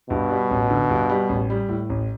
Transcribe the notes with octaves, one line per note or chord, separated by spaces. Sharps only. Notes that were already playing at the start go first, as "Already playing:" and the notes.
G2 B2
G3
A1
D3
G2
G3
A1
G3
A2
A1